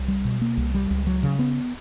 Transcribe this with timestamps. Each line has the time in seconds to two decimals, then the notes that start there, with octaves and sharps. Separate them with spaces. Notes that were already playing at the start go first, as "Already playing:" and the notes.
Already playing: C2
0.08 G3
0.25 B2
0.41 A#3
0.57 C2
0.74 G3
0.91 C#2
1.07 F#3
1.23 C#3
1.39 B3